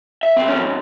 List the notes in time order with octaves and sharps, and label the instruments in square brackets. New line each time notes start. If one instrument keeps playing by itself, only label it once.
[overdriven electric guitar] E5
B1 C4
F2 C#4
G#2